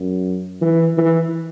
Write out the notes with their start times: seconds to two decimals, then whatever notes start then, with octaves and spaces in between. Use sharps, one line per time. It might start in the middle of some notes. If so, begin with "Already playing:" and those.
Already playing: F#2
0.61 E3
0.97 E3